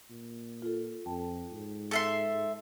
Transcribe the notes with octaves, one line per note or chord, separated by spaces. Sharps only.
A#2
F4 A4
F2 G5 A5
G#2
A4 E5 C6